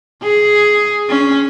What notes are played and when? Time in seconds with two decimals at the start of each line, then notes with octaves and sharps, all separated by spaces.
0.23 G#4
1.09 C#4